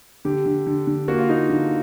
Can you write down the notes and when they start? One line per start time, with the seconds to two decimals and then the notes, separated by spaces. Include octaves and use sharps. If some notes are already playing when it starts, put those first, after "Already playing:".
0.25 D3 G4
0.46 D3
0.66 D3
0.87 D3
1.08 A#3 F#4
1.19 F4
1.29 A#3 D#4
1.50 D3